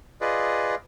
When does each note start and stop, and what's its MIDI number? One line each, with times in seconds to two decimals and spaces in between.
0.21 0.75 65
0.21 0.75 68
0.21 0.75 71
0.21 0.75 74
0.21 0.75 75